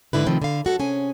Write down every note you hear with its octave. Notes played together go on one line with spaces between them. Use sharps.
G#2 D3 E4 B4
C3 D#3 F3 A3 C4
D3 F5
F#2 F#4 A4
C3 C#4 G#4 G#5